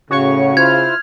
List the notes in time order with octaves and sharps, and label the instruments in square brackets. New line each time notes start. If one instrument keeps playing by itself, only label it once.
[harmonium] A2 [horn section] C#3 [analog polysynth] F#4 C#5 C#6
[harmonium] E4 F4 C5 [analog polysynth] F6 [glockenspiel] G#6